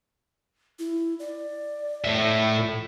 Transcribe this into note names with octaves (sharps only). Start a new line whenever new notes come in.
E4
D5
A2 E5